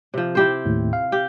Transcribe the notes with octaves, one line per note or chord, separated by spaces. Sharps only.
C3 F3
E4 G4 C5
D#2 A2
F5
G4